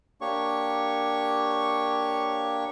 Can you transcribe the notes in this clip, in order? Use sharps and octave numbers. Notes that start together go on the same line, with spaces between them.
A#3 D4 G4 C#5 C#6